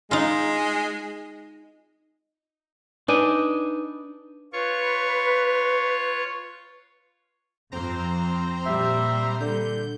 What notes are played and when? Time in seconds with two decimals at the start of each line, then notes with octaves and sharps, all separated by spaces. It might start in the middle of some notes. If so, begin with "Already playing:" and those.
0.11 G#3 D#4 F4
3.08 D4 D#4 B4 G#5
4.53 F4 B4 C#5 C#6
7.72 F2 C4 C5 A#5
8.66 A#2 G3 E5
9.40 D3 G6